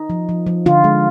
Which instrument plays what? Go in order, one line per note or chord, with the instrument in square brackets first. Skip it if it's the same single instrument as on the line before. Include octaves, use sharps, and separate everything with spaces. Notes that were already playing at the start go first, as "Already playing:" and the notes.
Already playing: [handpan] D#4
F3
F3
F3
D3 F4
G#3